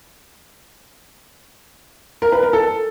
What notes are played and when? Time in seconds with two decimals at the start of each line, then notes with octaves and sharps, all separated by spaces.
2.22 A#4
2.32 B4
2.43 A#4
2.53 A4